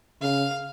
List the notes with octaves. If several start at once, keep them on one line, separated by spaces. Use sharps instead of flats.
C#3 F5